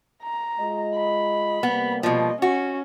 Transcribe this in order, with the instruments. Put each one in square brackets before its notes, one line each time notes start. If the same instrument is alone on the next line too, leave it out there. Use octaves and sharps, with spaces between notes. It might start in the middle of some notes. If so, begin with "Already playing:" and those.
[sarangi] A#5
[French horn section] G#3 F4 D#5
[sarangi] B5
[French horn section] C3 G3 A#3 [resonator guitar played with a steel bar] B3
[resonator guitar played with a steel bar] B2 F3 [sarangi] D#5
[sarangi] C#4 [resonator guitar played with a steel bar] F#4